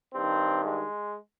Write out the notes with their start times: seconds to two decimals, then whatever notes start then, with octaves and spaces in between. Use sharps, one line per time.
0.13 G2 D#3 C4
0.64 G#3